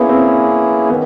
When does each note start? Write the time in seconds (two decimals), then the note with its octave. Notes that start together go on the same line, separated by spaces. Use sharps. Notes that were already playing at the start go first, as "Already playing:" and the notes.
Already playing: A#3 B3 C#4 E4 G#4
0.09 C4
0.90 D#3 B3